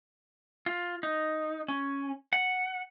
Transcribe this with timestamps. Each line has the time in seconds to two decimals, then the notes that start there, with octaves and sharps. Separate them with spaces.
0.66 F4
1.03 D#4
1.68 C#4
2.33 F#5